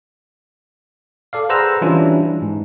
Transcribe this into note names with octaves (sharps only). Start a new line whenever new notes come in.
A4 D5 F5
G#4 B4 C5 F#5 A#5 E6
E3 G3 C#4 D4 E4 F4
G#2